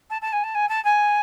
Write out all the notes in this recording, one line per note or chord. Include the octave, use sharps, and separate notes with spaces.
A5
A5
G#5
A5
G#5
A5
G#5